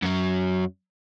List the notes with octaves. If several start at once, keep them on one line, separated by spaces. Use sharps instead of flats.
F#2 F#3